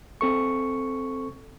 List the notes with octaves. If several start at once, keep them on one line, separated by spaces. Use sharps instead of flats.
C4 A4 C#6